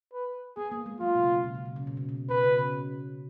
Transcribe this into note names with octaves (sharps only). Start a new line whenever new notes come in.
B4
B3 G#4
A#3
G#3
F#3 F4
B2
C#3
B2
C#3
B2
C#3
B2
C#3
B2
B2 B4
C#3
C#3